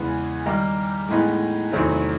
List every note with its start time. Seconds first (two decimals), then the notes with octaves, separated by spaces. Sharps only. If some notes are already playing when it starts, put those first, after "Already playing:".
Already playing: E2 C#3 E3 G#3 B3
0.46 D#3 G3 A#3 D#4 G4
1.09 A2 E3 G#3 B3 D#4
1.72 E2 C3 D#3 F#3 A3